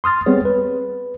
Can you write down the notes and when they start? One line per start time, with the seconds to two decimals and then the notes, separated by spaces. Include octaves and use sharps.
0.04 C6 D#6 F6 A6
0.26 G3 B3 C4 G#4 C#5
0.45 B4